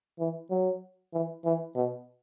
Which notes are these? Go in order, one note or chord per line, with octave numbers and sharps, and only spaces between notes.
E3
F#3
E3
E3
B2